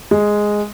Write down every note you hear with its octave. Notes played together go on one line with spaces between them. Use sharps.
G#3